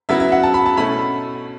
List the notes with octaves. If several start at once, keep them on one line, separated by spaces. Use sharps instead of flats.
C#3 F#3 B3 E4 E5
E5
F#5
A5
B5
A5
B2 A3 C#4 E4 B5